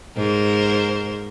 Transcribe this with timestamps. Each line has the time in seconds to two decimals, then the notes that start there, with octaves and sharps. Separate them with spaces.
0.16 G#2 A#4 C5